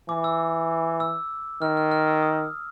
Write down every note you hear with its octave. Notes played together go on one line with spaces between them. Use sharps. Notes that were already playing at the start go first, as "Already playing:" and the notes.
E3 D6
E6
E6
D#3 F6
F6
F6
E6
D#6